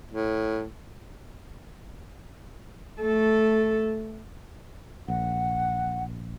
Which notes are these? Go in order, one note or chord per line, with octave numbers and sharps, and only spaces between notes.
A2
A3 A4
A#1 F#5